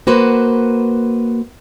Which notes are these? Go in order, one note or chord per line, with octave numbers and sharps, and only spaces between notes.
A#3 F#4 B4 C5